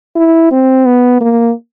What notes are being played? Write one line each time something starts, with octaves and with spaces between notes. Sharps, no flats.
E4
C4
B3
A#3